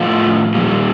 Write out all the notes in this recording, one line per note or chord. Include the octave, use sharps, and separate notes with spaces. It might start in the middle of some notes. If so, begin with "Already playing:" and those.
Already playing: A2 F3 F4
A#2 G3